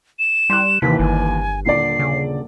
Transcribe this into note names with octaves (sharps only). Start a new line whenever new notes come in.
E7
G3 C6 F#6
D#2 C3 E3 B6
G1 G#5
D#1 D3 D5 C7
C#3